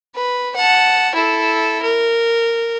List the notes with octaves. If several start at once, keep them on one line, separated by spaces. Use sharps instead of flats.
B4
F#5 A5
E4 A4
A#4